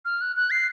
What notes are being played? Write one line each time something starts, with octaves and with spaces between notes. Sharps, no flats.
F6
F#6
F#6
C7